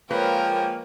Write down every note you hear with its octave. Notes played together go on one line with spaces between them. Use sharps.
F3 G#3 A#3 A#4 B4 C#5 G5